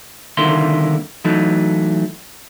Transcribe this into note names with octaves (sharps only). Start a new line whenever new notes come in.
C2 D3 D#3 A#3 E4 C6
E3 F#3 A3 D#4